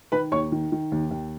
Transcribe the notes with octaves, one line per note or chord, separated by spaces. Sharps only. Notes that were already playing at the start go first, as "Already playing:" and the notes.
D#3 B4 B5
D#2 C#5 C#6
D#3
D#3
D#2
D#2